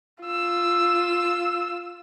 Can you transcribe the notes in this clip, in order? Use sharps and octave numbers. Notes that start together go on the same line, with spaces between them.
F4 E6